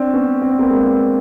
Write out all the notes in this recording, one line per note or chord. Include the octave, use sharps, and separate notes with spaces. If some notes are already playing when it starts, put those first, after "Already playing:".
Already playing: C4 D4
B3 C#4
C4
B3
A#3 C4
G#3 A#3